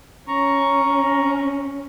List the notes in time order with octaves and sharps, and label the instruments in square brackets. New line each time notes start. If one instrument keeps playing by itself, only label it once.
[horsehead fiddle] C#4 [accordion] A#5 C#6